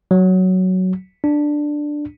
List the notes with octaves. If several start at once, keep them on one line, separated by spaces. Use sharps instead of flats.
F#3
D4